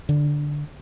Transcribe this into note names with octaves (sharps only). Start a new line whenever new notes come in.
D3